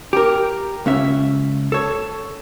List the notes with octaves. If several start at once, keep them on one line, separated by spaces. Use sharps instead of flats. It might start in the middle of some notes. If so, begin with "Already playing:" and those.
G4 A#4
C#2 C#4 E5
A4 C#5